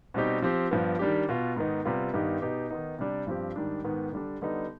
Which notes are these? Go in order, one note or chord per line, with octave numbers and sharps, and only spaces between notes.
B2 G3 C4 D#4 G4
F3 C4 G4
G2 F3 B3
D#3 G3 D4 G4
B2 B3 F4
G#2 D#3 B3 D#4
C3 G3 B3 F4
G2 D#3 B3 D#4 G4
B2 B3 D#4 G4
D#3 B3 D#4
C3 G3 D4
G2 F3 C4 G4
G#2 D#3 G3 D4
G#2 D#3 B3
D3 G3 D4
D3 G3 B3 D#4